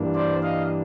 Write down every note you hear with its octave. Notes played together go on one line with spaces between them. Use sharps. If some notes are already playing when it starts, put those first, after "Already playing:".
Already playing: G2 E3 G3 A#3 D4
C5 D5
D#5 F5